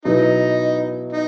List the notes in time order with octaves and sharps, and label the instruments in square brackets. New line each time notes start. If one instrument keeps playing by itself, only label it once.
[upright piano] B2 F#3 B3 E4 [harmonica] D#4
[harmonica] D#4